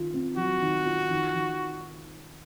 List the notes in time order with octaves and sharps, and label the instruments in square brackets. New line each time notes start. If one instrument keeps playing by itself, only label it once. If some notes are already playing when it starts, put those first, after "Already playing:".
Already playing: [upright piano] D#3 F4
C4
[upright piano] F#3 [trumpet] F#4
[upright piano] D#3
F4
D#3
D#3